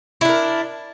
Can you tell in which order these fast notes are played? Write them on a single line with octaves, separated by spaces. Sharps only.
E4 D4 A#4